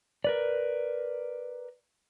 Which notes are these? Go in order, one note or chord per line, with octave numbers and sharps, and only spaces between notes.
A#4 B4 D5